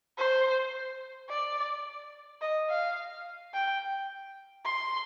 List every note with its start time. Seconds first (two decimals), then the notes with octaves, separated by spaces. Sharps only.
0.17 C5
1.30 D5
2.41 D#5
2.70 F5
3.54 G5
4.66 C6